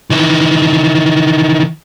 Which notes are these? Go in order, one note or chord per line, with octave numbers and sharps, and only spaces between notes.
D#3 E3